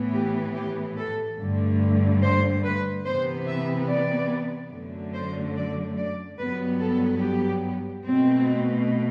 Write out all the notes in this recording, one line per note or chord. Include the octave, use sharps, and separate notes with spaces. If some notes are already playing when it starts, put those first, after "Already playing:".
Already playing: A2 E3 B3
G4
G4
A4
G2 D3 A3
C5
B4
C3 E3 B3 C5
E5
D5
F#2 D3 F#3 A3
C5
D5
D5
G2 F#3 B3 B4
A4
G4
B2 A3 C4